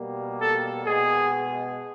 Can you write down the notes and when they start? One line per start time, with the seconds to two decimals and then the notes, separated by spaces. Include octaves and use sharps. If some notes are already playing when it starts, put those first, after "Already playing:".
Already playing: B2 G3 A#3
0.39 A4
0.85 B2 G#3 G#4